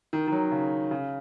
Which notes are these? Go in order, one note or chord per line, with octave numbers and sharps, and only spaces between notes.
D#3
D#3
F#3
C#3
C#3